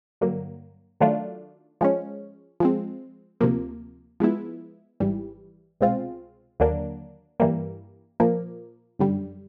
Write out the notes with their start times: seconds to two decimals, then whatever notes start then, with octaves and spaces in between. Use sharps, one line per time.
0.21 G2 D3 F#3 A#3
1.00 D#3 F#3 A3 D4 F4
1.81 F3 G#3 C#4
2.60 F3 G#3 C4
3.41 D2 C3 F3 A#3
4.20 F3 G#3 B3 E4
5.00 G#1 G#2 E3 G3
5.81 C2 B2 G#3 C4 F4
6.60 D#2 D3 F#3 A#3 D4
7.40 G2 E3 G3 A#3
8.20 A#2 F3 A#3
8.99 G1 F#2 D3 G3